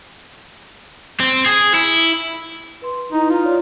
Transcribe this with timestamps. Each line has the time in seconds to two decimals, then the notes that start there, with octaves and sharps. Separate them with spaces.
1.20 C4
1.46 G#4
1.74 E4
2.82 B4 C6
3.12 D#4 E4
3.30 F4
3.44 C#5 D5